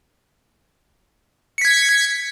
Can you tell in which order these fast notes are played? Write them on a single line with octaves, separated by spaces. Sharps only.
C#7 B6 G#6